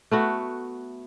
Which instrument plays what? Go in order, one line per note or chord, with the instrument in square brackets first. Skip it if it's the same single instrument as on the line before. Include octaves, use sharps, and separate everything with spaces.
[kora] A3 B3 F#4